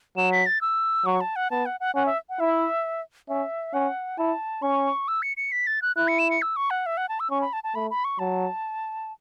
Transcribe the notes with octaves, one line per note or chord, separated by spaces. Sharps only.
F#3 E7
B6
A6
E6
F#3 C#6
A5
F#5
B3 A5
F#5
F#5
C#4 F#5
E5
F#5
E4 E5
C#4 E5
C#4 F#5
E4 A5
C#4 C#6
E6
C#7
C#7
B6
A6
F#6
E4 F#6
C#7
E7
C#7
E6
C#6
F#5
E5
F#5
A5
E6
C#4 C#6
B5
A5
A5
A3 B5
B5
C#6
F#3 A5